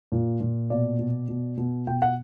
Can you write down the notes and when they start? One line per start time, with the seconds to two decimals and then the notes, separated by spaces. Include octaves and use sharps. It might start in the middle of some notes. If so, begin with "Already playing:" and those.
0.12 A#2
0.40 A#2
0.70 B2 D5
0.99 B2
1.28 B2
1.57 B2
1.87 B2 G5
2.02 F#5